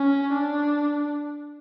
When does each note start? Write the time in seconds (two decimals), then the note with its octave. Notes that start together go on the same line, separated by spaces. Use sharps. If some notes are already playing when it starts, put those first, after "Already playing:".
Already playing: C#4
0.33 D4